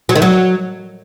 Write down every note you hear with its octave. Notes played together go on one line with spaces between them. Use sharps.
F#3
D#3
F#3